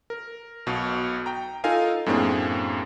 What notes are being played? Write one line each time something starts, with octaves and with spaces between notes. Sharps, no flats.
A#4
B1 B2
G5 A#5
D#4 F4 A4 A#4 F5 G#5
F#2 A2 A#3 C4 D4 G#4